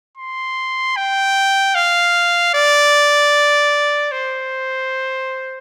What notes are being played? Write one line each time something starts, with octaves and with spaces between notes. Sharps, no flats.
C6
G5
F5
D5
C5